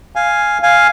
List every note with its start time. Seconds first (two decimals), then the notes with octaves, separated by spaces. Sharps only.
0.16 F5 G#5
0.63 F5 G#5